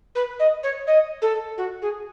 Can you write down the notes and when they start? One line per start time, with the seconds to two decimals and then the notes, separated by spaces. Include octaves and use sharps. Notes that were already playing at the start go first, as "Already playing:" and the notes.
0.15 B4
0.39 D#5
0.63 C#5
0.87 D#5
1.22 A4
1.58 F#4
1.82 G#4